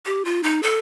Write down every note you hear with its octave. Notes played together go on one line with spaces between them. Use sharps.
G4
F4
D#4
A4